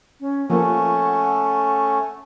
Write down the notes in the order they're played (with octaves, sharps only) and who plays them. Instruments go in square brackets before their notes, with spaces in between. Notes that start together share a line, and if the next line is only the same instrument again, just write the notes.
[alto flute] C#4
[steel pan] F3 A#3 [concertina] A3 C#4 [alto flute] F#5